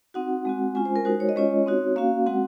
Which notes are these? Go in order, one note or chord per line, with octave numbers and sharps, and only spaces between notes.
C4 D#4 F#4 F#5
G#3 C4 F#4
G#3 C#4 F4 G#5
C5
A#4
G#3 D#4 F#4 C5
C#5
D#5
G#3 C#4 F4 C#5
C4 D#4 F#4
A#3 C#4 F#4 F5
G#3 C4 F#4 F#5